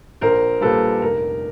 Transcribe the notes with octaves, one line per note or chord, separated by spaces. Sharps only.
A#1 A#4 C5
A#2 G3 A4 B4
F1 A#4